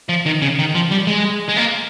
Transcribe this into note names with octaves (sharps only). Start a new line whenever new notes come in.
F3
D#3
C#3
D#3
F3
G3
G#3
G#3
A#3